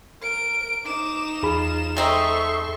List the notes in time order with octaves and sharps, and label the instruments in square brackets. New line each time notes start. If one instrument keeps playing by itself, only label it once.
[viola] A#4 [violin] D7
[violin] D#4 E7 [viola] D6
[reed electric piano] E2 G#4 B5 [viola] F4
[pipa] G#3 C4 D#4 [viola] A4 E5 [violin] C6 C#6